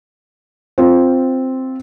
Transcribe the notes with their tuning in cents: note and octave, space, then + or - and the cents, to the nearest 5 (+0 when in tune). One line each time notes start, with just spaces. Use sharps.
C4 +0 F4 +0